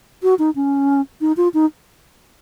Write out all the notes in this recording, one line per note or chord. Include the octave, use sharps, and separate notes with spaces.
F#4
D#4
C#4
D#4
F4
D#4